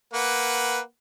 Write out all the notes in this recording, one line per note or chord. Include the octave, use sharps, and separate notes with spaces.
A#3 B4 F#5